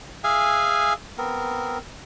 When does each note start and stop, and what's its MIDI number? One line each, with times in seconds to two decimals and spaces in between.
0.24 0.93 68
0.24 0.93 76
0.24 0.93 77
0.24 0.93 80
1.18 1.78 59
1.18 1.78 60
1.18 1.78 70